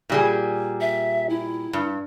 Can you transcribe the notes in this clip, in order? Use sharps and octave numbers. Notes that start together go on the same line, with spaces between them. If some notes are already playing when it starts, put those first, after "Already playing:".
A#2 G3 G#4
E5
E4
G2